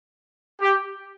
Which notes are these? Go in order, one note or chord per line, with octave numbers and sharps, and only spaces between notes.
G4